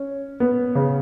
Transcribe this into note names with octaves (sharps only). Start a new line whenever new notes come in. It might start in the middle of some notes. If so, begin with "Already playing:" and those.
Already playing: C#4
B3
C#3